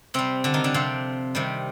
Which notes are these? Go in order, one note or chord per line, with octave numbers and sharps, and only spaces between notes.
C3 G3 C4
D3 D4
D#3 D#4
D3 D4
C3 F3 C4
C3 D#3 G3